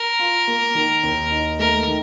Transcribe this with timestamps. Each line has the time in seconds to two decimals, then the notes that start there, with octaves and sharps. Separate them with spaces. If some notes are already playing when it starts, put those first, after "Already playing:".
Already playing: A#4
0.19 F4
0.48 A#3
0.75 D#3
1.03 D#2
1.31 D#4
1.59 A3 A#4
1.87 D#3